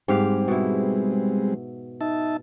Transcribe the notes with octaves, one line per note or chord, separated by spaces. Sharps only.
G#2 G3 G#3 C4 G4 F5
B2 E4
D#4 E5 A5